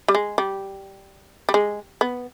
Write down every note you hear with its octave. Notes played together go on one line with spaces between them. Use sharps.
G3
G#3
G3
G3
G#3
B3